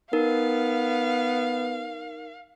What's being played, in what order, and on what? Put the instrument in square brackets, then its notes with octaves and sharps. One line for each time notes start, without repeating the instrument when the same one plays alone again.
[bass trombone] B3 [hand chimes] D#4 A#4 [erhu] F5